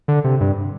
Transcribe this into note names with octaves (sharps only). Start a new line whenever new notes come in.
D3
C3
G2